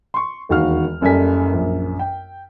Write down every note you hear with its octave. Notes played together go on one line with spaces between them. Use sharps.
C6 C#6
E1 D#2 D#3 F#4 F5 F6
F#1 F#2 G3 A4 G#5 B6
A#1 F#2
G5